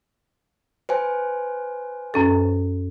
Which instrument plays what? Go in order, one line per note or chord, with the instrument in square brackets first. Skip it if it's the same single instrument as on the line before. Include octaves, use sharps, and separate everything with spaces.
[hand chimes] B4 C5 G#5
[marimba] F#2 C#4 A4